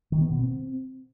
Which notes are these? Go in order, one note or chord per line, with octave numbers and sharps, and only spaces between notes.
D#3
B3
B2
C4